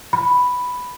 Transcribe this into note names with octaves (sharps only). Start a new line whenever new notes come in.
B5